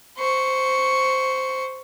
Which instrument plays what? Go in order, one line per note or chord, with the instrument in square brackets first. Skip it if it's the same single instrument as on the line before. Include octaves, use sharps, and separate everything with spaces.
[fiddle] C5 C#6